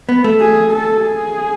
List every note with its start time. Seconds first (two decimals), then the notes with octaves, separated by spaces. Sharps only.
0.09 B3
0.24 A3
0.41 G#4
0.72 A4
1.04 G#4